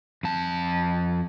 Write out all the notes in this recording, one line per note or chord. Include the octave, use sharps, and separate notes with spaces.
F2 A5